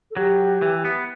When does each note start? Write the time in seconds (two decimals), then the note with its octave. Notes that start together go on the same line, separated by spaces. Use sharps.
0.11 A4
0.17 F#3 G4
0.62 E3
0.85 B3